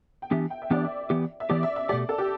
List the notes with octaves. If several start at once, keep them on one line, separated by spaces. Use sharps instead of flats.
G5
E3 B3 D4 G4 E5
G5
E5
E3 B3 D4 G4 D5
E5
E3 B3 G4
E5
E3 B3 G4 D5
E5
E5
B2 A3 G4 D5
A4
G4